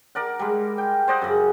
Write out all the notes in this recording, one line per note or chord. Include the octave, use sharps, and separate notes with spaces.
A#4 D5 F#5
G3 G#3
G5
C5 D5 D#5 F#5
F#2 C#3